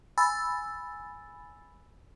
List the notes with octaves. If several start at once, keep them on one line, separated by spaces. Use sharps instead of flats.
G#5 B5 E6 A6